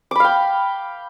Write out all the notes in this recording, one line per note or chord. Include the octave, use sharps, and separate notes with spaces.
F5 G5 B5 D6